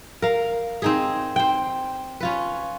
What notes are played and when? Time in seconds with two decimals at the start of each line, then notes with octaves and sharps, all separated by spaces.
0.22 A#4 F5
0.82 C4 D#4 G#4
1.36 C5 G5
2.20 C#4 F4 B4